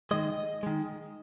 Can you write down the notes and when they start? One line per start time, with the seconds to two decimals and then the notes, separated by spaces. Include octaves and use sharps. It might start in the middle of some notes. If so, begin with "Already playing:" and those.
0.11 D#3 G#3 D#5
0.63 D#3 G#3